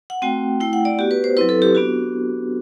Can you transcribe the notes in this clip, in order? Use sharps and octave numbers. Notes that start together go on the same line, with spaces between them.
F#5
A3 C4 F#4 G5
A3 E4 G5
F#5
D5
B3 F#4 G4
B4
C5
F#3 C4 E4 B4
A4
G4
B3 D4 F#4